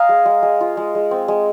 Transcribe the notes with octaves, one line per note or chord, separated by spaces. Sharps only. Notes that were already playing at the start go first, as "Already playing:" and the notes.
Already playing: D#5 F5 G#5 A#5
G#3
G#3
G#3
F4
G#3
G#3
C4
G#3